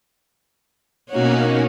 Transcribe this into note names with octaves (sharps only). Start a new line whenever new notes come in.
B2 A#3 C#4 D#4 F#4 C#5